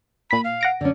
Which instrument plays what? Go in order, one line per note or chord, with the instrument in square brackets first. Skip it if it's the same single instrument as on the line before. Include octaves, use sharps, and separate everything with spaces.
[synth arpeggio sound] A#2 B6 [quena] B5
[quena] F5
[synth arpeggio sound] F#5 A#6 D7
[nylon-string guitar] D3 C#4 [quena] D5